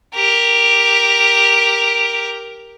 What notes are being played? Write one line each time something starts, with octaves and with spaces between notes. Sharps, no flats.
G4 A#4